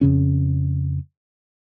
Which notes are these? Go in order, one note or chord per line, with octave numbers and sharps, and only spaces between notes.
F2 C#3 C#4